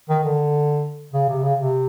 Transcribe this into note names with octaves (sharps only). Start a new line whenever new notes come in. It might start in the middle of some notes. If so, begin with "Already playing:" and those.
D#3
D3
C#3
C3
C#3
C3